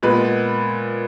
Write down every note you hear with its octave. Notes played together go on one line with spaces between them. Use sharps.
A#2 G#3 B3 B4